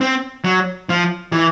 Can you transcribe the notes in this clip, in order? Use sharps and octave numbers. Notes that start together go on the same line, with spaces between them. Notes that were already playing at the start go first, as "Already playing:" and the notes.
C4
F#3
F3
E3